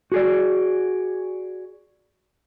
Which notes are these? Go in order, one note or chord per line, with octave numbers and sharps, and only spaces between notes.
F#4 G#4 D5